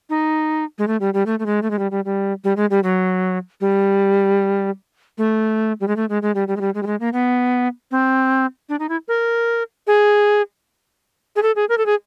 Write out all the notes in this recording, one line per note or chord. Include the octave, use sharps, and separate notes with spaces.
D#4
G#3
A3
G3
G3
A3
A3
G#3
A3
G#3
G3
G3
G3
G3
G#3
G3
F#3
G3
A3
G3
G#3
A3
G#3
G#3
G3
G3
G#3
G3
G#3
G3
G#3
A#3
B3
C4
D4
D#4
E4
A#4
G#4
G#4
A4
G#4
A#4
A4
G#4